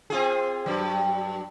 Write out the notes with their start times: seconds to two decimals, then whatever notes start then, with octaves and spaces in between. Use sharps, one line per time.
0.10 C4 F4 G#4
0.66 G2 F#3